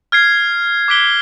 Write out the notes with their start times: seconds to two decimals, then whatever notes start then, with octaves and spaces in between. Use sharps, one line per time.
0.12 F6 G#6 C7
0.88 D6 F#6 B6 D7 G7